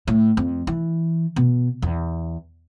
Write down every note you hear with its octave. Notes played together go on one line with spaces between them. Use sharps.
A2
F2
E3
B2
E2